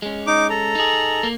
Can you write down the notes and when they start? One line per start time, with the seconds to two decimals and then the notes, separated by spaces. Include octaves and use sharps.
0.02 G#3 C#4
0.27 D#4 D6
0.50 A4 A#5
0.75 D#4 G#4
1.23 A#3